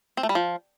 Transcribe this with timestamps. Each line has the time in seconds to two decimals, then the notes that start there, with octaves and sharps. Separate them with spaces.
0.17 C4
0.23 A3
0.29 G3
0.35 F3